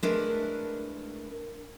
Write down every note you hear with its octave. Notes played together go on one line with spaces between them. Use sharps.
G#3 A3 D4 E4 A#4 B4